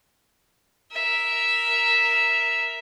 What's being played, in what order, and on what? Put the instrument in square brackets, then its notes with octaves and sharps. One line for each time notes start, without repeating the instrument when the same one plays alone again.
[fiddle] A#4 E5